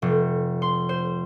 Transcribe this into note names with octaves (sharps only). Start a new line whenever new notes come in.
F1
C6
C5